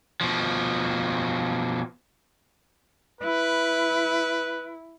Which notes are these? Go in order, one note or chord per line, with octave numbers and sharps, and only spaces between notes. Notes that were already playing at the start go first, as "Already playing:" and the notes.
B2 F3
E4 B4